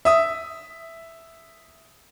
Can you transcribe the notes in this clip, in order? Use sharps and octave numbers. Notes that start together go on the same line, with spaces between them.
E5 D#6